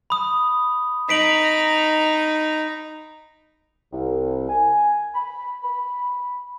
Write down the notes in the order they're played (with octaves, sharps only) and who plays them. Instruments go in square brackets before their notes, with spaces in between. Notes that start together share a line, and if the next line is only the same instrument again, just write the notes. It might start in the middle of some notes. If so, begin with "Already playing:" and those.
[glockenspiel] B5 D#6
[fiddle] D#4 A#5 [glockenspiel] B6 D7 F#7
[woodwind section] C2
G#5
B5
B5